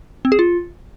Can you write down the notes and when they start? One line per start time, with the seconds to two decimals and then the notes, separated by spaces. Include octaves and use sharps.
0.25 C4
0.32 G#4
0.39 F4